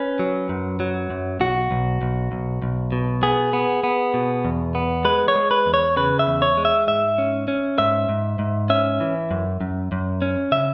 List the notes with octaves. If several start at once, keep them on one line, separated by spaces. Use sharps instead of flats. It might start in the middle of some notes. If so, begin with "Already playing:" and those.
Already playing: C#4 B4
F#3
F#2
F#3
F#2
B1 F#4
B1
B1
B1
B1
B2
B3 G#4
B3
B3
B2
E2
B3
G#3 B4
C#5
G#3
B4
E2
C#5
C#3 B4
E5
E2
C#5
G#3
E5
G#2 E5
C#4
C#4
G#2 E5
G#2
G#2
C#4 E5
E3
F#2
F#2
F#2
C#4
C#3 E5